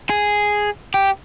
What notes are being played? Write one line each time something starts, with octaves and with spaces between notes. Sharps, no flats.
G#4
G4